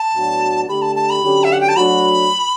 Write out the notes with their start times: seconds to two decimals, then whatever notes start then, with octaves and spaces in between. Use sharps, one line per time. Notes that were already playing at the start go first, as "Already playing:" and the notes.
Already playing: A5
0.15 A2 F#3 B3 D4 F#4
0.68 D3 A3 E4 G4 B5
0.82 A5
0.96 A5
1.10 B5
1.23 D3 F#3 C#4 G4
1.44 E5
1.52 F#5
1.61 G5
1.69 A5
1.76 F#3 A3 D4 F#4 B5